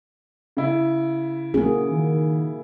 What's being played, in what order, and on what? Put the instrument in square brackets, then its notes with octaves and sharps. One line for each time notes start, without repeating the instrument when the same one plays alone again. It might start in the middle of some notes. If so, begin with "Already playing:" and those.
[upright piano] C#3 E4
[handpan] A#3 F#4 G#4 [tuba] C#4
[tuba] D#3